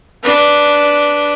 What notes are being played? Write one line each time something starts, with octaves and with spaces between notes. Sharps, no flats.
D4 B4